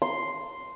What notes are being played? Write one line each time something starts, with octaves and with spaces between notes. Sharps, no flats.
C6